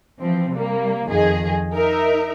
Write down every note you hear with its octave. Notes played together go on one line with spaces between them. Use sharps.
E3 F3 C4
C3 G3 A#3
F2 D#3 F3 G#4 D#5
D#4 A#4 E5